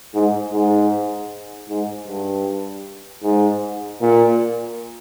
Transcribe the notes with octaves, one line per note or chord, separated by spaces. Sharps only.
G#2
G#2
G#2
G2
G#2
A#2